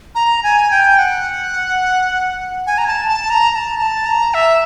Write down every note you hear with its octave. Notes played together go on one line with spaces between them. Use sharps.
A#5
G#5
G5
F#5
G#5
A#5
A5
A5
A#5
A#5
A5
A#5
A5
A#5
E5